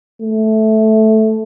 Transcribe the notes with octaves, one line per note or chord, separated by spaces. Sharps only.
A3